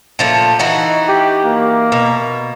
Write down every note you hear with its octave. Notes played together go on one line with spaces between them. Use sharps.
A#2 F3 A3
E3 D#4 F#4
G4
A#3
B2